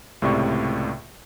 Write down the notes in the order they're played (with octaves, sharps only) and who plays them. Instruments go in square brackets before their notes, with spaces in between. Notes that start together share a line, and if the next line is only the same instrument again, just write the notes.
[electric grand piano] C#2 A2 C3 D5 C#6